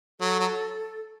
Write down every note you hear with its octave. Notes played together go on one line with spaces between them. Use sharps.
F#3 A4
F#3